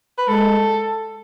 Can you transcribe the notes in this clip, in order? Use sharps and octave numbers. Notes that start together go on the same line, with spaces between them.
B4
G#3 A4